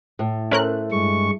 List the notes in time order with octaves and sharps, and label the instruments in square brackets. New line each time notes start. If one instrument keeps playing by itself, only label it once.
[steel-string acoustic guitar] A2
[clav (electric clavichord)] A3 C5 E5 [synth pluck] C#4 A#4 F#6
[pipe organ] G2 G#3 C#6